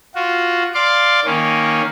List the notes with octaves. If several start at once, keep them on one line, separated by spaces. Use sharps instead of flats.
F4 F#4
D5 F5 C6 D6
D#3 A#3 C#4